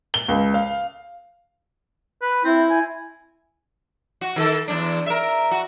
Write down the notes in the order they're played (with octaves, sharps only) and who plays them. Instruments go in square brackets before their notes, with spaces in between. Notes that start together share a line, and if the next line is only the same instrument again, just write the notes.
[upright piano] G7
C#2
F5
[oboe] B4
[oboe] C4 [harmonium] E4
[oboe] G#5
[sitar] F#4
D#3 G#4 A4
E2 G#2 D4
A#4 E5
F#4